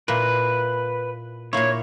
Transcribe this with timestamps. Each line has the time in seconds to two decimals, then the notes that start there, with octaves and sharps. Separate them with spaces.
0.08 A#2 A#3 E4 B4
1.53 A#2 A#3 E4 C#5